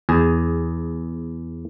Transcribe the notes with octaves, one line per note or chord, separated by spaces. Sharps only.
E2 G#4